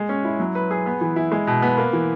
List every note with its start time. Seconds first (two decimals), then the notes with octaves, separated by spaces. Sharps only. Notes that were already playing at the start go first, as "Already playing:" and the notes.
Already playing: G#3
0.09 C#4
0.25 E4
0.40 F#3
0.55 B4
0.71 G#4
0.86 B3
1.01 E3
1.16 E4
1.32 G#3
1.47 B2
1.62 B3
1.78 A#3
1.93 E3